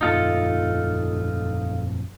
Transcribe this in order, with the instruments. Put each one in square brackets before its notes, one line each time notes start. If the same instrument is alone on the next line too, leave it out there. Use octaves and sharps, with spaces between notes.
[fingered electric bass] A#1 F#2 [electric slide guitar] D#4 F4 A4